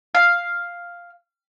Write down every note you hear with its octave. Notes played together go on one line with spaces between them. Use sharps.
F5